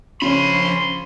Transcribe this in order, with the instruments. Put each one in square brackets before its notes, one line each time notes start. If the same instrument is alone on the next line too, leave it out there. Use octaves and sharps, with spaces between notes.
[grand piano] C#3 C#4 [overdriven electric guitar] F3 B5 [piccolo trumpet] C6